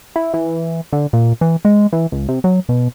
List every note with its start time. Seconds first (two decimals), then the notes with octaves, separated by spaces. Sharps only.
0.16 E4
0.34 E3
0.92 D3
1.13 A#2
1.41 E3
1.65 G#3
1.93 E3
2.12 C#2
2.29 C3
2.44 F#3
2.69 B2